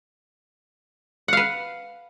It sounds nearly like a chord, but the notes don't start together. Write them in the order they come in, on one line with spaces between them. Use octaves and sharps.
F#5 F5 B4